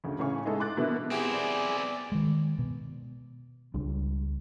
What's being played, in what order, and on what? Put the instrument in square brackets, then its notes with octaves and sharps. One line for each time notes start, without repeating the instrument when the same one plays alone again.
[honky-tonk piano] D2 C#3
A2 C#3 C#4 F5 G#5 C#6
G#3 D#4 E4 G#4 A4
C6 D6 F#6 A6
B2 D3 A#3 E4
[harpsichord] E3 B3 [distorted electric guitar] C4 E4 [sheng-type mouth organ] G4 [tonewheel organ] G#4
[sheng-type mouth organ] D5
[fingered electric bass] D#3 G#3
B2
C#2 G3 D4